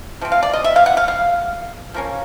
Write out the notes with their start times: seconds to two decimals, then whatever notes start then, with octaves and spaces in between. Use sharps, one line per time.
0.21 C3 F3 C4
0.32 F5
0.43 D5
0.53 D#5
0.64 E5
0.76 F5
0.86 F#5
0.97 F5
1.08 F5
1.94 F3 A#3 C#4